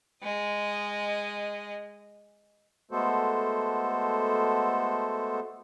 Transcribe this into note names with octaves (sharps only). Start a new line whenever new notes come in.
G#3 D#5
G#3 A3 B3 F#4 A4 C5